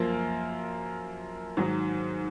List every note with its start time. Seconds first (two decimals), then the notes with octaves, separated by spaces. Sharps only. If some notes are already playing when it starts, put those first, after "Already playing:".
Already playing: F#2 F3 A#3 F4
1.57 G#2 D#3 F#3